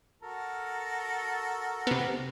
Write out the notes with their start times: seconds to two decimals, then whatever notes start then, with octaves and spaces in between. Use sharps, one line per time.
0.23 F#4 A4 A#4
1.87 C3 B3